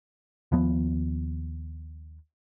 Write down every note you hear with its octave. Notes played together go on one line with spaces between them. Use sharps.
D#2 F3 B3